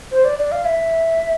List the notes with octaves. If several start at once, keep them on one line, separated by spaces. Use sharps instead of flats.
C5
D5
D5
F5
E5